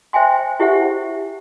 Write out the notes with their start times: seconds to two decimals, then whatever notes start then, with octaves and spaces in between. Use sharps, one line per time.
0.13 C5 E5 G5 G#5 C6
0.60 E4 G4 C5 E5 F#5